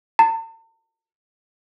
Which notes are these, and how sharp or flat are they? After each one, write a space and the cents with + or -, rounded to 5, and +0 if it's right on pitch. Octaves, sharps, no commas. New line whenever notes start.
A5 +45